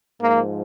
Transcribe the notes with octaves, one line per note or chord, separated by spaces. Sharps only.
G#2 F3 A#3